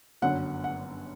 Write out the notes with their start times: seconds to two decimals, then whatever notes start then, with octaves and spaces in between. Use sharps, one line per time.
0.22 G1 F#2 D3 F#3 F#5
0.64 F#5